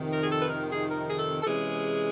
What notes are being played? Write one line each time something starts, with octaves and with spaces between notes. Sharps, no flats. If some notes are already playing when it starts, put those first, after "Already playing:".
Already playing: F2 C3 D#3
A#4
G#4
A4
B4
A#4
G#4
A#4
G#4
A4
A4
C3 E3 G#3 C#4 G#4